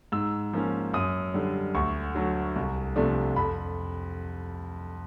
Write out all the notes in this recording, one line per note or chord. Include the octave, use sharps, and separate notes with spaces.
G#2 E6
F3 A#3 C#4
F#2 D#6
D3 G3
D2 C#6
D3 F#3 A3
C2
C3 F3 A3 D4
F2 B5